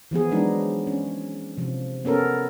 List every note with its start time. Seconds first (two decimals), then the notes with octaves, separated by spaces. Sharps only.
0.11 E3 F3 B3 G#4
0.31 F3 F#3 G#3 D4 D#4
0.87 C#4
1.58 C3 F3
2.05 B3 C#4 A4 A#4